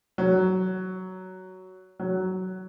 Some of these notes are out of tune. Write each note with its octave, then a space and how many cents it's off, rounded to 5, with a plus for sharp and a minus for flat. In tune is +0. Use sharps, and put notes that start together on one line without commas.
F#3 +10
F#3 +10